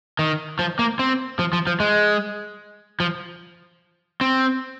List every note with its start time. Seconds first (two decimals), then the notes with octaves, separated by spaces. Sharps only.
0.19 D#3
0.59 F3
0.79 A#3
0.99 C4
1.39 F3
1.53 F3
1.67 F3
1.80 G#3
3.00 F3
4.21 C4